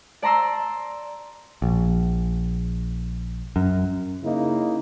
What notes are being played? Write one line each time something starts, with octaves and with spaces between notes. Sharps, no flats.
D5 A5 A#5 C6 E6
A#1
F#2
C#3 A#3 D#4 E4